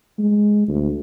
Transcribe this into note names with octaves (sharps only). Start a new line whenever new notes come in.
G#3
D2